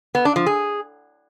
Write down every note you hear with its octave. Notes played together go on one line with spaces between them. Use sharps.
B3
D4
F3
G#4